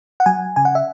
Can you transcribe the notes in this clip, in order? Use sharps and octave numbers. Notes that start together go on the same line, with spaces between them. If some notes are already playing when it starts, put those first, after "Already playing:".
F#5
F#3 G#5
C#3 G#5
F#5
E5